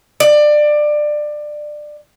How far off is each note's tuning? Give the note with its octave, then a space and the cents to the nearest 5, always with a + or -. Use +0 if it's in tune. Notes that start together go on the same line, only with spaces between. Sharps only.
D5 +20